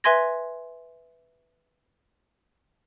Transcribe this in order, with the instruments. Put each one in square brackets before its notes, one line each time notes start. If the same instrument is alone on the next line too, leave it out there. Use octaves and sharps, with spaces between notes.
[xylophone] B4 E5 G#5 C6 G#6 A#6